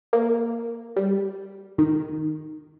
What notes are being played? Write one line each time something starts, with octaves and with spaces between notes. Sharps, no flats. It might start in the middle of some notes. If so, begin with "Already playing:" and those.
A#3
G3
D#3